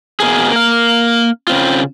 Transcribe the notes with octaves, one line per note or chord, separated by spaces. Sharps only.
B2 A#3 G#4
A#3 F5
C#3 C4 F4